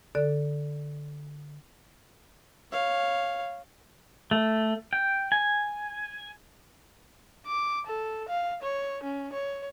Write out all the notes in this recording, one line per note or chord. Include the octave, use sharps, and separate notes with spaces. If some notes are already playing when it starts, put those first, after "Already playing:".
D3 A4 D5
C#5 F5
A3
G5
G#5
D6
A4
F5
C#5
C#4
C#5